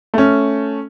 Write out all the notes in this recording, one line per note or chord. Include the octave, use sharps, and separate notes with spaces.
A3 C#4